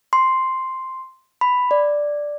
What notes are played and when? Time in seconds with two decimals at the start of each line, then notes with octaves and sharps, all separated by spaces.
0.13 C6
1.41 B5
1.71 D5